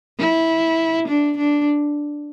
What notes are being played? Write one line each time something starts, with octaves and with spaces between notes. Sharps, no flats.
E4
D4
D4